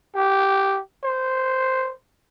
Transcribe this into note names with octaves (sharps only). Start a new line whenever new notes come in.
G4
C5